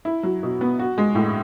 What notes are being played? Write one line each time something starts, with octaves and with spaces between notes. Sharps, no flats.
E4
F#3
B2
B3
F#4
G#3
A2